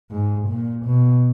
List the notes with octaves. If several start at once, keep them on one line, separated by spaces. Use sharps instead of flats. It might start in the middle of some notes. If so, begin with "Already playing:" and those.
G#2
A#2
B2